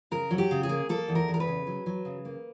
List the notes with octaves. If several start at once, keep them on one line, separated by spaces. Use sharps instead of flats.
C#3 A#4
F#3
G4
C#3
G#4
A#3
A#3 A4
E2
A#4
E2
A#4
B4
C#3
F#3
F#3
C#3
A#3